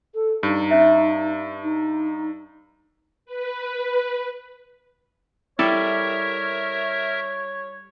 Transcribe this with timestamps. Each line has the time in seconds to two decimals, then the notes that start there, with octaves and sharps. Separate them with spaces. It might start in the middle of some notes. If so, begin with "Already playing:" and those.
0.15 A4
0.43 G2 D#4
0.71 C#4 E5
1.63 D#4
3.26 B4
5.59 G3 E4 A4 A#4 C#5 E5